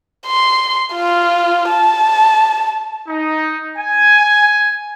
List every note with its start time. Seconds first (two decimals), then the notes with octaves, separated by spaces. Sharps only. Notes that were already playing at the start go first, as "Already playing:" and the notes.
0.27 C6
0.94 F4
1.69 A5
3.08 D#4
3.77 G#5